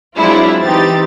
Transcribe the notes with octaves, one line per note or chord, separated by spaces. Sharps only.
F#3 G#3 C4 D4 E4 F4
E3 C4 D#4 G4 A6